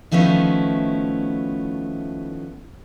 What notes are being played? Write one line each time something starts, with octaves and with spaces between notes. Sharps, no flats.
D#3 F3 A3 B3 C#4 E4